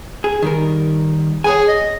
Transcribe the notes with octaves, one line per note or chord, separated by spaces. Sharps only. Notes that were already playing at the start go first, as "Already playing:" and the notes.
G#4
D#3 G3 A#4
G#4 C#5 F#5 G#5
D#5